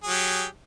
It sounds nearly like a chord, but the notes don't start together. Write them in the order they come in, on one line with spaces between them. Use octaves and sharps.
G#4 F#3 G4